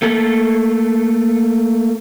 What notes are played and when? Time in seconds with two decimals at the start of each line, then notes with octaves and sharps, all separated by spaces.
0.02 A3 A#3 A4